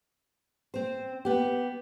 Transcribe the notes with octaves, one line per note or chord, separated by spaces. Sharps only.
C4 C5
B3 G4